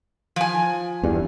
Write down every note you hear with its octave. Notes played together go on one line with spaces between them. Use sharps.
F3 G#5
E2 G2